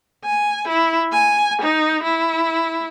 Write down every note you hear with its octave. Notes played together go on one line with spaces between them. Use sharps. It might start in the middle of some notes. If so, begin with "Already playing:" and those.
G#5
E4
G#5
D#4
E4